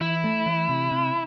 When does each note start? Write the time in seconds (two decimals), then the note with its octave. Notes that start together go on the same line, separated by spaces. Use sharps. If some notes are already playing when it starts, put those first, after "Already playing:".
0.01 E3 E4
0.24 A3
0.46 E3
0.69 C3
0.92 C3